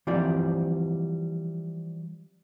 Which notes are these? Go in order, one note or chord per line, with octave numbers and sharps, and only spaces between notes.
E3 F3 G3 C4 D5